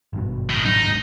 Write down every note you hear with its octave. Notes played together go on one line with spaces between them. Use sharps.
G#1 G2 B2
A2 D#3
A1 F#3 D4 D#4
G#1 D#2 G#2